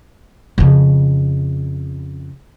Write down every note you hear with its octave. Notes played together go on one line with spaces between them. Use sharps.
F2 C#3